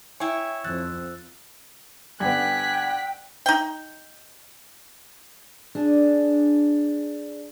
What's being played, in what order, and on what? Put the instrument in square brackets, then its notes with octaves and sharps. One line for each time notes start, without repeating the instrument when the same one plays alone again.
[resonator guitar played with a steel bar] E4 C#5 [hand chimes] G5 G#5
[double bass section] F2 [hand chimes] E6 F#6 A6
[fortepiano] G2 D3 B3 [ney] G5 [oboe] G#5 [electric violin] F#6 B6
[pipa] D#4 G5
[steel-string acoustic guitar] D4 G#4